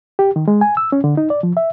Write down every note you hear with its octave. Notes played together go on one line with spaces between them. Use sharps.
G4
D#3
G#3
G#5
E6
C#4
D3
D#4
D5
F3
E5